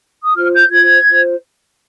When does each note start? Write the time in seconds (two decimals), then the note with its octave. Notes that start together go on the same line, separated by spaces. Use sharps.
0.24 D#6
0.35 F4 C5 F6
0.53 G6
0.71 F4 C5 G#6
1.06 F4 C5